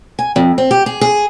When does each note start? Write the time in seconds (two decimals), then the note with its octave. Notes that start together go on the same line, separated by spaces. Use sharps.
0.19 G#5
0.36 F2
0.58 C4
0.71 G4
0.86 G#4
1.01 G#4